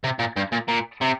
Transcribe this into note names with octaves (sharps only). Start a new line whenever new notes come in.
C3
A#2
G2
A#2
A#2
C3